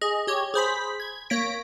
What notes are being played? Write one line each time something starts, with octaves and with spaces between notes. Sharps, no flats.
G#4 D#5
G4 C#5 G#6
G#4 C5 B5 B6
G#6
A#3 C#5 A#6 B6 D7